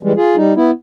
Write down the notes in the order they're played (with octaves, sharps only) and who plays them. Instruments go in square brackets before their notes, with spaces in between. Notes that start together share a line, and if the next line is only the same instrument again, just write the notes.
[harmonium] E3 G3 G#3
F4 G#4
G3 D#4
B3 E4